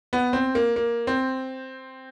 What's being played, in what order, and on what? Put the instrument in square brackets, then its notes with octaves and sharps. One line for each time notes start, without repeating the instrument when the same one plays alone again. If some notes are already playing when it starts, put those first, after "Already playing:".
[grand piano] B3
C4
A#3
A#3
C4